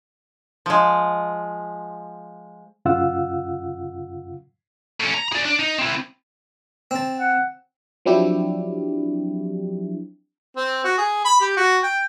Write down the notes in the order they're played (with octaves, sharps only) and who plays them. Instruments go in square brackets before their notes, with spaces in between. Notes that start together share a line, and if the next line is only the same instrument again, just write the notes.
[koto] F3 G#3
[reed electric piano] F#2 C#3 F4 F5 F#5 E6
[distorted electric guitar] A2 C#4
A#5
G#4 D5
D4 D5
D#4
C4 E4
[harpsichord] C4 A5
[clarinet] F#5
[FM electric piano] F3 F#3 C4 D4 E4 G4
[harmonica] C4
F#4
G#4
B5
G4
F#4
G5